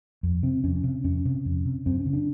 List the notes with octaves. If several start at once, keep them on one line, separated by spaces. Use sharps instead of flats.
F2
C3 C4
F2 C#4
C3
F2 C#4
C3
F2
C3
F#2 C4
C#4
C#3
D4